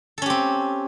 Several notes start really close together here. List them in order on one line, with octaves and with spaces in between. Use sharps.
A4 C#4 G4 C4